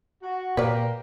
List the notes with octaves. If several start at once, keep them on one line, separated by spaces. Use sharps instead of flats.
F#4
A#2 A#3 G4 A#4 B4 D5